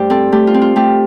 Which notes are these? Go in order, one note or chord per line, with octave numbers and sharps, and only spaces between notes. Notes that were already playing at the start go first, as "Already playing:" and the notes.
Already playing: G2 A3 G4 C5 D5
C4 A4
A3 G4
F4
C4
F4
A3 G4